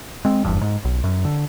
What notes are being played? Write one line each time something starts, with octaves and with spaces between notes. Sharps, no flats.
G#3 C4
F#1 E2 G2
G#2
B1
F#2
D3